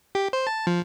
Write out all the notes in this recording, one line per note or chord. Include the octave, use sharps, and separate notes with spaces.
G4
C5
A5
F3